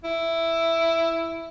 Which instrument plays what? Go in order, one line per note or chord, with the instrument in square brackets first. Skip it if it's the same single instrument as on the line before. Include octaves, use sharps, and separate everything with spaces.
[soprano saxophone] E4